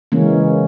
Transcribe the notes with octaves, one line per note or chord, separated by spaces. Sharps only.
C#3 E3 G#3 A#3 C#4